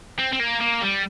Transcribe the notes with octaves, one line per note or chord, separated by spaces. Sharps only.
C4
C4
A#3
A#3
G3